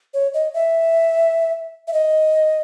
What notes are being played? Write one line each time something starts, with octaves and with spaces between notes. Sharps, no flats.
C#5
D#5
E5
E5
D#5